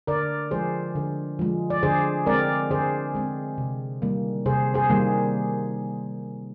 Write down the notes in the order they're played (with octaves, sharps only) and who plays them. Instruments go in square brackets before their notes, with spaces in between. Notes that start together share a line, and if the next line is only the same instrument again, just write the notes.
[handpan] D3 A#4 D5
F3 G#3 G#4 C5
D3
F3 G#3
D5
D3 G#4 C5
G#3 C4 A#4 D5
D3 G#4 C5
G#3 C4
C3
D#3 G3 A#3
C3 G#4 C5
G#4 C5
D#3 G3 A#3